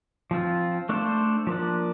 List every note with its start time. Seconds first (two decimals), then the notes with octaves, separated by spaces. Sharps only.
0.31 F3 C4 F4
0.89 A3 D4 A4 C5
1.47 F3 A#3 D4